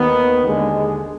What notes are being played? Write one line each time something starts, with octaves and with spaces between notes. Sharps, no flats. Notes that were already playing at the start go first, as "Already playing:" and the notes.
Already playing: D#2 D#3 B3
D#2 D3 G#3